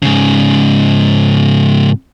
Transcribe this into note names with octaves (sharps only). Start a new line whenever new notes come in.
G#2 C#3